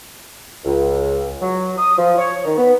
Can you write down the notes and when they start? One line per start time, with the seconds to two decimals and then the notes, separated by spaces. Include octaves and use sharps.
0.64 C#2
1.41 F#3
1.78 D#6
1.97 F3
2.18 C#5
2.45 D#3
2.57 B3